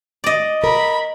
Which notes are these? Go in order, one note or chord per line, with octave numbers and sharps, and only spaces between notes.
D5 D#5
A#4 B5